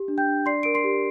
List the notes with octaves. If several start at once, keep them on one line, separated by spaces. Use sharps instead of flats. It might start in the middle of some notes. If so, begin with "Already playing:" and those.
Already playing: G4
D4
G5 G6
D4
D5 C6 C7
A#4 D7
C6 C7
G4